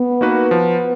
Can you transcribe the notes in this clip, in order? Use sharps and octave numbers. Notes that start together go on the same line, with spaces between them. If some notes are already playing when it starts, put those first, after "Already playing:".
Already playing: B3
A#3 D#4 F#4 B4
F3